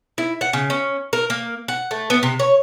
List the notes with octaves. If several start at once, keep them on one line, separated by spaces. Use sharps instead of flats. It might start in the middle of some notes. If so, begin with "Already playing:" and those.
E4
F#5
C#3
C#4
A#4
A#3
F#5
A3
B3
C3
C#5